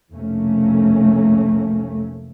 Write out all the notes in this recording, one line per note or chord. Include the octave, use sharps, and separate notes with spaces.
F1 B1 A3 A#3 C#4